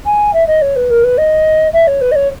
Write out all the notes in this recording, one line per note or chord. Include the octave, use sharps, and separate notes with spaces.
G#5
E5
D#5
C#5
B4
A#4
B4
D#5
E5
C#5
B4
D#5
C#5